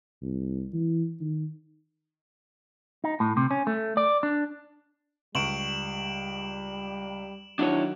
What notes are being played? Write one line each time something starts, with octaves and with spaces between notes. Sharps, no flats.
C2
E3
D#3
D#4
A2
C3
C#4
A3
D5
D4
C#2 G3 C#6 D7 E7 F#7
D#3 F#3 D4 E4 F#4 C#5